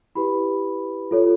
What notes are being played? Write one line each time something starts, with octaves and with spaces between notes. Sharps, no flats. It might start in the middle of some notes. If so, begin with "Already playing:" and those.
E4 G4 B4 B5
F4 A4 C#5